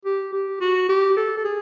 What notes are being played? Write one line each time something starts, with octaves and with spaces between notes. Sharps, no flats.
G4
G4
F#4
G4
A4
A4
G#4